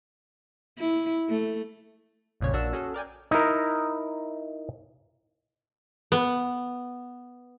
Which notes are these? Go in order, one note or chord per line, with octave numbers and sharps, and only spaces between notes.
E4
A3
A1 F2 A#2 C#3 C#5
A#1 A#3 D4 F#4 E6 E7
C#4 F#4 G#4 A4
A#4 D5 G5 G#5
D#4 E4 A#4
B3